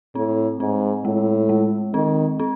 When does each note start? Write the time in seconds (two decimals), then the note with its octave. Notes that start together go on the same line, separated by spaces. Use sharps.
0.15 A2 C4
0.60 G#2 C4
1.05 A2 G#3
1.49 G#3
1.94 D#3 C4
2.40 C4